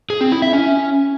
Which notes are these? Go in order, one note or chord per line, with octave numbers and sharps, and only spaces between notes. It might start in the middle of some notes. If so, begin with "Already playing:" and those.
G#4
C4
E4
E5
C#4